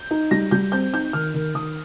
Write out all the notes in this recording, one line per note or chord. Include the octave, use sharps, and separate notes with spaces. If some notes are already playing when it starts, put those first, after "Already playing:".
Already playing: G6
D#4
G3 A#6
G3 G6
C4 G6
D#4 G6
D#3 F6
D#3
D#3 D#6